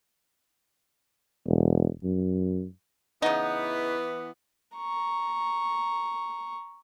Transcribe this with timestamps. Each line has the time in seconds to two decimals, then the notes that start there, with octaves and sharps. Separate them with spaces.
1.47 E1
2.04 F#2
3.22 C#3 E3 B3 D#4
4.77 A#5 C#6